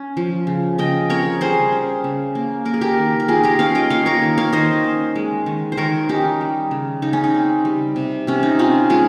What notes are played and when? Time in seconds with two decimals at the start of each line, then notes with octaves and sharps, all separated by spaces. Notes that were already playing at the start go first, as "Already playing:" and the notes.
Already playing: C#4
0.17 F3
0.47 C#3
0.78 C#3 D#5 G5
1.09 C4 A#4 C#5
1.41 G3 G#4 C5
1.72 C#4
2.04 C#3
2.35 A#3
2.65 A#3 A#4
2.74 G#4
2.81 G4 A#4
2.97 D#3
3.20 A#4
3.28 D#3 F4 G#4
3.43 G4 A#4
3.59 C#4 C#5 F5
3.75 D#5 G5
3.90 A#3 C#5 F5
4.06 A#4 C#5
4.22 D#3
4.38 C#5 F5
4.53 D#3 C5 D#5
4.84 C#4
5.16 G#3
5.46 D#3
5.72 C5
5.77 D#3 A#4 C#5
6.09 C#4 D#4 G4
6.41 G3
6.71 C#3
7.02 C#3 D#4
7.13 C#4
7.24 D#4
7.34 C4
7.65 G3
7.96 C3
8.27 C3 C#4
8.43 D#4
8.59 C4 C#4 F4
8.90 G#3 F4 G#4